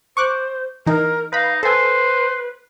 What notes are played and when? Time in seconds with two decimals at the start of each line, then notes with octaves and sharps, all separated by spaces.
0.17 C5 C#6 D6 F#6
0.86 E3 D#4 A#4
1.33 D#4 B4 F5 B5
1.63 A4 B4 C5 G#5